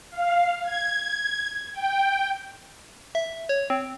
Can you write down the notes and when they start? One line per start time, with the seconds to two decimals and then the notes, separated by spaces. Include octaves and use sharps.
0.11 F5
0.63 G#6
1.73 G5
3.15 E5
3.49 C#5
3.70 C4